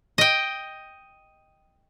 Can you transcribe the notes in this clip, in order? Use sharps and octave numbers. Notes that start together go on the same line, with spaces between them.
D#5 G5